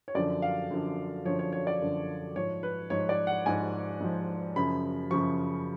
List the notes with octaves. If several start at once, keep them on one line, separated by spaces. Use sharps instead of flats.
C#5
F#2 D3 F3 D5
F5
F#2 D3 F3
F#2 D3 F3 C#5
C#5
C#5
D5
F#2 D3 F3
G#2 F3 C#5
B4
G#2 F3 C#5
D5
F#5
G#2 F3 G#5
G#2 F3
F#2 C#3 F3 B5
F#2 C#3 F3 C#6